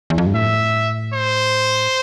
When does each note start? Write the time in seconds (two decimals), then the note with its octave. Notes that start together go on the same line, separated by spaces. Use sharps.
0.10 E2
0.18 F2
0.27 G2
0.34 A2 E5
1.13 C5